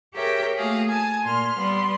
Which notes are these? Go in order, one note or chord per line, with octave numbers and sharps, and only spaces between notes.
G4 G#4 A#4 C#5 E5 G5
A3 A#3 F#4 G#4 F5
G#5 A5 D#6
A#2 C6 F6
G3 B3 C6